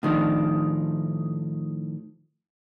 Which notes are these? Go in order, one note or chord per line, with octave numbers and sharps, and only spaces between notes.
A2 D#3 F3 D4